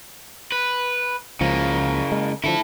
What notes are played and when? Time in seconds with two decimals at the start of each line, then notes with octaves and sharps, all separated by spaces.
0.52 B4
1.41 C#2 C#3 F3 A#3
2.12 G#3
2.44 D3 D#3 F3 E4 A4